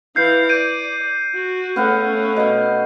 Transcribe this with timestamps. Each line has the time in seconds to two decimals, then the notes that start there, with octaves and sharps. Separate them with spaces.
0.16 E3 F5 G6 C7
0.49 D5 G6 D7 D#7
1.34 F#4
1.76 A3 B3 C#4 F5 F#5
2.36 B2 F5